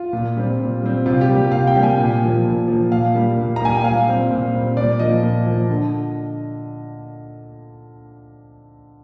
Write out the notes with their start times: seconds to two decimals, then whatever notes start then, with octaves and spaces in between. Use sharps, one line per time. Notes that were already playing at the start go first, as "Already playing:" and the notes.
Already playing: F4
0.13 A#2
0.37 G3 C4
0.60 A#2
0.82 G3 C4
1.06 C3 F4
1.21 G4
1.29 G3 A#3
1.52 C3 F5
1.67 G5
1.75 G3 A#3
1.83 G#5
1.98 A#2
2.22 F3 A#3
2.45 A#2
2.68 F3 A#3
2.91 A#2 F5
3.15 G3 A#3
3.38 A#2
3.56 A#5
3.61 G3 A#3 G#5
3.75 G5
3.84 A#2 F5
4.07 G3 C4
4.31 A#2
4.54 G3 C4
4.77 A#2 D5
5.00 F3 A#3 D#5
5.23 A#2
5.46 F3 A#3
5.70 D3